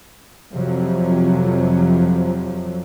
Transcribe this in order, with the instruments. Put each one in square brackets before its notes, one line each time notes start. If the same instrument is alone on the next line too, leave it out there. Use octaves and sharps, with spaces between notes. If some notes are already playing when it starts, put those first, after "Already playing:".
[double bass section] F2 C3 F3 F#3